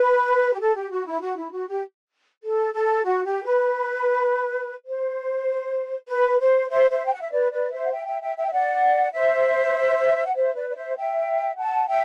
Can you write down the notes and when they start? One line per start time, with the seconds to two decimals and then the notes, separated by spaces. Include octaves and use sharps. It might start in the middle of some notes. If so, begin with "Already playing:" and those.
Already playing: B4
0.54 G4
0.60 A4
0.75 G4
0.90 F#4
1.06 E4
1.21 F#4
1.37 E4
1.52 F#4
1.67 G4
2.43 A4
2.73 A4
3.04 F#4
3.24 G4
3.44 B4
4.87 C5
6.08 B4
6.40 C5
6.70 C5 E5
6.90 C5 E5
7.05 G5
7.14 F#5
7.22 E5
7.31 B4 D5
7.51 B4 D5
7.72 C5 E5
7.82 F#5
7.92 E5 G5
8.07 E5 G5
8.22 E5 G5
8.37 E5 G5
8.47 E5
8.53 D5 F#5
9.13 C5 E5
10.26 F#5
10.36 C5 E5
10.56 B4 D5
10.69 D5
10.76 C5 E5
10.96 E5 G5
11.58 F#5 A5
11.88 E5 G5